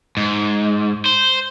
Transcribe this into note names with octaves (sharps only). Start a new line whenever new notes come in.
G#2
C5